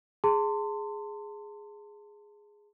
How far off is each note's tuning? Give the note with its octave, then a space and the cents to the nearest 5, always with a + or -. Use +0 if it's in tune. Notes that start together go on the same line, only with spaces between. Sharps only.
G#4 +0 A5 +35 C6 -10